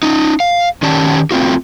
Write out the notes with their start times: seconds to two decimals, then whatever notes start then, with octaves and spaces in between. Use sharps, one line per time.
0.03 C#4 D#4
0.40 F5
0.83 D#3 C#4 G4 D5 A5
1.31 A3 C4 F4 F#4